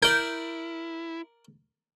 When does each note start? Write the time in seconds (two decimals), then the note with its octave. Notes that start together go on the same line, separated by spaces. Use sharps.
0.03 E4 A#4 D5 G6